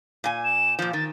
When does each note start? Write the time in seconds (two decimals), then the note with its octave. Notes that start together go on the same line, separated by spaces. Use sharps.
0.24 A#2 G#5
0.44 E7
0.79 A#2 F3 G6
0.93 D#3 A6